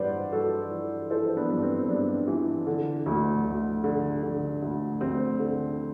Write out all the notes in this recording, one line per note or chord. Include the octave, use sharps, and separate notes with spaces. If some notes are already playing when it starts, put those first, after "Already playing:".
Already playing: G2 E3 B4 C5 D5 F#5
G2 F#4 A4
E3
E3 A4 C5
B3 D4
G2
C4
G2 B3 D4
E3
D3
D2
D2
D3
D3
D2
D2 C4
D3